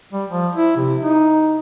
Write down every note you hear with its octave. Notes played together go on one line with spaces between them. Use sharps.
G3
F3
E4
C3
D#4